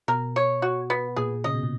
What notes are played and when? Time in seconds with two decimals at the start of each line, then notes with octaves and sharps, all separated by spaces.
0.08 B2 A#4
0.36 C#5
0.62 F#4
0.90 B3
1.16 A#2 G#4
1.44 C#3 D#5
1.54 B2
1.63 A#2